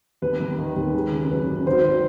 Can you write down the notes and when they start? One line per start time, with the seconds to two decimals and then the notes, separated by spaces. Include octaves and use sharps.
0.22 D#2 B4
0.40 D#2
0.58 D#3
0.76 D#2
0.93 G#3
1.12 C#3
1.30 F#2 B4
1.48 C#3
1.66 G#1 C5
1.85 D#3